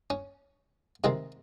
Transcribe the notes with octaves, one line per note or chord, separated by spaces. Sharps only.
C#4
C3 D#3 G#3 C4 D#4